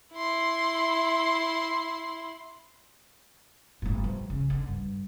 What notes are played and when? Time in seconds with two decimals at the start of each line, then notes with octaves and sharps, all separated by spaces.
0.13 E4 C6
3.82 G1 A2
4.04 F3
4.30 C#3
4.50 D3
4.68 G2